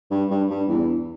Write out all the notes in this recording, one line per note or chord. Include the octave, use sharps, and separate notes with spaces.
G2
G2
G2
E2